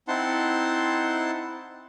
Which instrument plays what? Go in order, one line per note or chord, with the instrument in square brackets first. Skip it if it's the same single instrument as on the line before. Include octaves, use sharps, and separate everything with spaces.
[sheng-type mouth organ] C4 D#4 E4 F#5 A5 C6